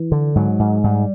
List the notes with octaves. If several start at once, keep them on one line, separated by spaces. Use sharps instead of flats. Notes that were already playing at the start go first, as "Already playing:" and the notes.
Already playing: E3
D3
G#2 F#3
G#2
G#2 G3